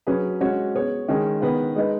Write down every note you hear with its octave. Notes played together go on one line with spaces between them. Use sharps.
F#3 C#4 G#4 B4
G#3 C#4 F#4 C#5
B3 G#4 C#5
D#3 G#3 C#4 G#4
D#3 B3 G#4 B4
G#3 D#4 B4